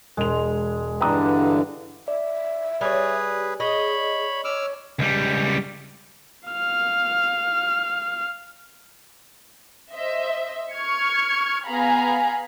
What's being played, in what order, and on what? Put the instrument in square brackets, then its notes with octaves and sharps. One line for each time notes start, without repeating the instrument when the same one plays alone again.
[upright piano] E1 F7 [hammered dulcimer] G#3
[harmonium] G2 D3 E3 [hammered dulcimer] D4 B4 [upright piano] G5 A#5 D#6
[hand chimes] D5 [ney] E5
[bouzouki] G3 C#5 [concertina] G#4 B4 [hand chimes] D5
[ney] G#4 [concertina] C#5 B5 [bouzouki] D#5
[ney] C#5 [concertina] D6 E6 F6
[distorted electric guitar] C#2 G3
[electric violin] F5 F6
[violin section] C5 D#5 E5
C#6 F6 G#6 C#7
B3 G#4 F5 G#5 A#5 B5